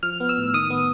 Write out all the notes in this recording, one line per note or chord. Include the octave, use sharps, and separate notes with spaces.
F3 F6
B3
E6
A2
D#3 D#6
B3